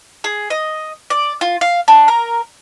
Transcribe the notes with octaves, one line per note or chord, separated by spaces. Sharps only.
G#4
D#5
D5
F4
F5
D4
A#4